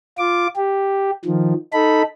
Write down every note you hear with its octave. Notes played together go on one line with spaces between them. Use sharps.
F4 D6
G4
D#3 F3
D#4 A4 B5